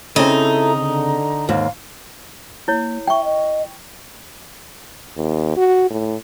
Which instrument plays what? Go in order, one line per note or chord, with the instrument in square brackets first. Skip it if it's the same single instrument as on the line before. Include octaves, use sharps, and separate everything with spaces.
[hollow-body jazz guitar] C#3 C4 [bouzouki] D#4 [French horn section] E4 A4 [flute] A#5
[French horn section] D3
[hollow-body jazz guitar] D#2 G#2 [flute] F5
[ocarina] A#3 [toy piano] E4 C#5
[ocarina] E5 [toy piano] G5 C#6
[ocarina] D#5
[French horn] D#2
F#4
A2